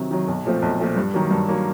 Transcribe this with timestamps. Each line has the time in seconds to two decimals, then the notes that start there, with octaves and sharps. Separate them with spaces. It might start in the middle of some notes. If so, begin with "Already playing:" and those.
Already playing: C3 D#3 F#3
0.11 D#3 F#3
0.28 B1
0.45 A#2 F3 A3 C4
0.62 B1
0.79 A#2 F3 A3 C4
0.96 G2
1.14 D#3 F#3 A#3
1.31 G2
1.48 D#3 F#3 A#3